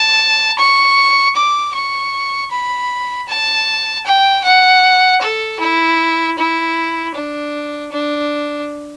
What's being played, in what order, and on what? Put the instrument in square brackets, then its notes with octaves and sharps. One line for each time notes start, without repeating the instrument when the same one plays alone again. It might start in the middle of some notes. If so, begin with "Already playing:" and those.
Already playing: [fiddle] A5
C#6
D6
C#6
B5
A5
G5
F#5
A4
E4
E4
D4
D4